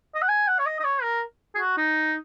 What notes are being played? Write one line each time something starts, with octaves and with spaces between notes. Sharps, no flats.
D#5
F#5
G#5
F#5
C#5
D#5
D#5
C#5
A#4
G#4
F#4
D#4